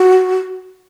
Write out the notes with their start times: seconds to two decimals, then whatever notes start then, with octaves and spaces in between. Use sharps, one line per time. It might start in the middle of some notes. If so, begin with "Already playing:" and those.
Already playing: F#4